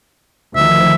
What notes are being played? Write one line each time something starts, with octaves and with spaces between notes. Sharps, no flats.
D2 D#3 F3 E5